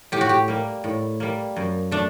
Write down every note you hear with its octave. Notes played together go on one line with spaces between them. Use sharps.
A2 G4
F#4
G4
G3 A#3
A2
G3 A#3
F#2
A3 D4